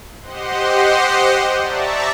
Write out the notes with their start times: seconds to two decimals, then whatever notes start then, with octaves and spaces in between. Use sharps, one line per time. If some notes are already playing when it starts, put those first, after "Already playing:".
0.21 G4 C5 D#5 F#5 C6
1.58 D5 E5 A5 A#5 C#6